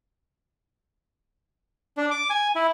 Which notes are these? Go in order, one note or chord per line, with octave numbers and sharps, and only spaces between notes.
D4
D6
G#5
E4